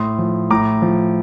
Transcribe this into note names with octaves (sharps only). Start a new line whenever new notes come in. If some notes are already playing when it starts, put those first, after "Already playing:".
Already playing: A2 C6 D#6
F3
A2 A#5 D6
F3